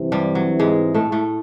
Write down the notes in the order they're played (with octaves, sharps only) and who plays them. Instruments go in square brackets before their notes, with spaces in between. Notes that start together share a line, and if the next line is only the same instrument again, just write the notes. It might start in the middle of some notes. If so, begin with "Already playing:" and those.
Already playing: [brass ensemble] C2 C3 E3
[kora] G2 G3
F#3
G#2 G#3
A2 A3
A2 A3